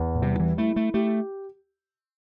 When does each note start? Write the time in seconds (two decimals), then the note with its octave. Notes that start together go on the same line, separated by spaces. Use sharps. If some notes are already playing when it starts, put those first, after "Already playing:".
Already playing: E2
0.15 A2
0.22 C3 G3
0.40 E3
0.58 A3 E4
0.76 A3
0.94 A3 G4